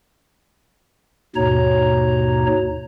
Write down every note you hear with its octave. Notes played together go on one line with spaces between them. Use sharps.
D#2 G#2 B2 D#4 C#5 A#5